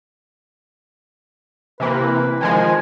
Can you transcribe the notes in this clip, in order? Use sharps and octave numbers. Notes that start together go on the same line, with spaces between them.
C3 E3 A#3 B4
D#3 F3 G#3 G#5